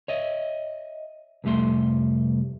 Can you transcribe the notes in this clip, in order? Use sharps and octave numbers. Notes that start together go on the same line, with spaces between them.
C#5 D#5 E5
C2 F2 G3 A3 C6